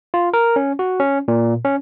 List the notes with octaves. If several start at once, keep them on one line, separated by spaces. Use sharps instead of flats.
F4
A#4
C#4
F#4
C#4
A#2
C#4